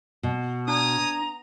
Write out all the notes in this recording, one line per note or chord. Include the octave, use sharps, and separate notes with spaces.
B2
D4 G#5 A#5 D#6